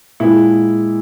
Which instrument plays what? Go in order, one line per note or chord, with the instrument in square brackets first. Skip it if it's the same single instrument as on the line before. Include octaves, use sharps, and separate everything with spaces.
[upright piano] A#2 G#3 E4